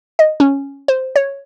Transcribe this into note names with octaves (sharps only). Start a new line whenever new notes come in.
D#5
C#4
C5
C#5